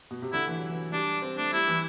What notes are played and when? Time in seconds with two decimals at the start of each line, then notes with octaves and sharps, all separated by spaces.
0.11 B2
0.22 C3
0.33 D3 E4
0.47 E3
0.59 F#3
0.70 E3
0.92 G3 D4
1.22 C4
1.37 A3 D4
1.53 G3 E4
1.68 E3